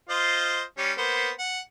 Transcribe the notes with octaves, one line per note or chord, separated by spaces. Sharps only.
F4 C5 D#5
G3 C#4
A#3 B3 C5
F#5